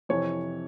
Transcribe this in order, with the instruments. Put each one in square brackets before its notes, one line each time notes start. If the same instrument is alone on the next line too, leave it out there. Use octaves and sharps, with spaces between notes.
[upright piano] F2 C3 E3 C#5